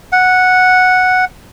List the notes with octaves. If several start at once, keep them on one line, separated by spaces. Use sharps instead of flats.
F#5